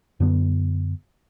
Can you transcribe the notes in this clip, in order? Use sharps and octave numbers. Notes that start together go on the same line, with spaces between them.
F#2 D3 B3